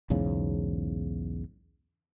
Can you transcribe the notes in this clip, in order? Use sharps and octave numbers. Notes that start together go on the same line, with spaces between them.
B1 E2 G#2 C#3